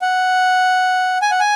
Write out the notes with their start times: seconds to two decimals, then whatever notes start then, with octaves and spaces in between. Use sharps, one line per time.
0.02 F#5
1.22 G#5
1.31 F#5
1.40 G#5